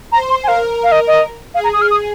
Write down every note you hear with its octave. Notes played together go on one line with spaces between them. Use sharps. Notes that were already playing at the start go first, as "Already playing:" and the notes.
C5 A#5
C6
G#5
A#4 F5
F5
D#5
D#5
G#4 F5
A#5
D#6
F6
D#6